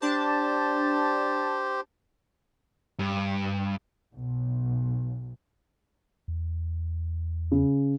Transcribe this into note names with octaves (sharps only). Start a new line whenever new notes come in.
D4 G4 C5 A5
G2
B1
E2
C#3